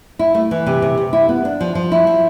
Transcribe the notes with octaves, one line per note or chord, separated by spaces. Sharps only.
E4
A3
E3
C3
C3
C3
E4
B3
D4
F3
F3
E4
F3